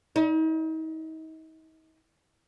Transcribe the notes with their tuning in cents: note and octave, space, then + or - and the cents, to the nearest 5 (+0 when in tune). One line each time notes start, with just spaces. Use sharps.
D#4 +40